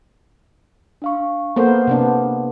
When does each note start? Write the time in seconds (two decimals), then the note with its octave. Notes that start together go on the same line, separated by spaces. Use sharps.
1.02 D4 F5 C#6
1.56 A#3 B3 A4 C5 F#5
1.87 C3 B3 D4